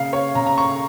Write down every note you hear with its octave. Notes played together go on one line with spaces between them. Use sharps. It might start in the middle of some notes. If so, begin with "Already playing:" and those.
Already playing: C#3 A#3 F5
C#5
C#3 A#5
A#5
C#6